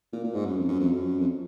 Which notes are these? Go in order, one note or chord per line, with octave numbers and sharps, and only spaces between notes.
A#2
A#2
G#2
F#2
F2
F#2
F2
F#2
F2